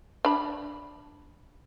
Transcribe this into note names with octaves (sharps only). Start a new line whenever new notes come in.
D4 B5